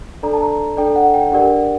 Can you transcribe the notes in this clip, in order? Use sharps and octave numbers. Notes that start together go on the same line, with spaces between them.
D4 A4 D5 A#5
A5
A#5
D4 A4 D5 G5
F#5
G5
D4 G4 A#4 D5 F#5